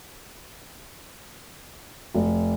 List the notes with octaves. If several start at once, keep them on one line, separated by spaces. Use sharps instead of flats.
F1